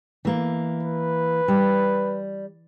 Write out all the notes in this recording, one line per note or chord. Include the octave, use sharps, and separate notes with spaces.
E3 A#3
B4
G3